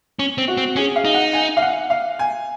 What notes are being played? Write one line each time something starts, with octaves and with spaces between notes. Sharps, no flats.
C#4
C4
F#4
C4
C#4 G#4
F5
D#4
F#5
G#5
F5
F#5
F5
G#5